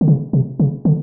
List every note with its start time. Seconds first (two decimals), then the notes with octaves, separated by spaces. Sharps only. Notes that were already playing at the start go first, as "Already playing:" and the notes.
0.01 D3
0.08 C#3
0.33 C3
0.60 C#3
0.85 D3